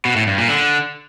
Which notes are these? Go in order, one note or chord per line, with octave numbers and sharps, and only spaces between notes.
B2
A2
G2
A#2
D3